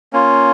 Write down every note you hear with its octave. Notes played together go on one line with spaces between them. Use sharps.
A#3 C#4 F4